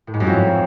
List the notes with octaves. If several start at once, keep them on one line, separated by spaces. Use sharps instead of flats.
A2
G#2
F#2
F2